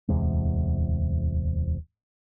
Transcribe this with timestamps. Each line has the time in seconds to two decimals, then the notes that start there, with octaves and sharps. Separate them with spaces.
0.09 D1 E2 C3 G#3